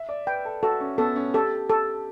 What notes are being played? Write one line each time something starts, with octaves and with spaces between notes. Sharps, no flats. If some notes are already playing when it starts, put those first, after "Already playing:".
Already playing: E5
D5
B4 G5
A4
F#4 A4
C#4
B3 A4
C#4
G4 A4
A4